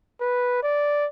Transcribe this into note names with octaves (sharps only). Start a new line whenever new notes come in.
B4
D5